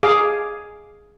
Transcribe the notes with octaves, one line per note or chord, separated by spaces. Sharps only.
G#4 F5 D6